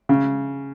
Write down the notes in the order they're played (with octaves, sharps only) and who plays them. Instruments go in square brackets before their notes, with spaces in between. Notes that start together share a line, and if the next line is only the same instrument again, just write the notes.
[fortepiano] C#3